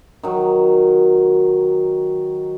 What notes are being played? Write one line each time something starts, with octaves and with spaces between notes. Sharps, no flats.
D#3 F#3